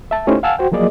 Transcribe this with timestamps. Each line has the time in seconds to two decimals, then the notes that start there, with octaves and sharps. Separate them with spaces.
0.11 E5 A5
0.27 A3 C#4 D#4 E4 G4 C5
0.43 F5 F#5 G#5 A5 E6 F6
0.58 F#4 C5 G5
0.72 F3 F#3 A#3 G#4 D5 D#5